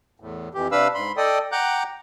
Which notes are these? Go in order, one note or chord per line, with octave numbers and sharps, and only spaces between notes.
E2 A2
F2 E3 G4
C3 D4 B4 F5 B5 E6
G#2 B5 C6
A4 D5 D#5 G5 D#6
F#5 G5 A#5 D6 F#6 G6